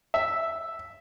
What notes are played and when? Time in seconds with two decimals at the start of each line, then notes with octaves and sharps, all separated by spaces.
0.14 E5